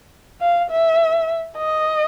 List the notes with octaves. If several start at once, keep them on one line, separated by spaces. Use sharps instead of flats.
F5
E5
D#5